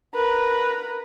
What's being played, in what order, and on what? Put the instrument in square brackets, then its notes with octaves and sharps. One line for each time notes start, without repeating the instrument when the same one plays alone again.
[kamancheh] A#4 B4